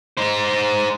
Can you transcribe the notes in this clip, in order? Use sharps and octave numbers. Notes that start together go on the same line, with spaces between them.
D#4 C5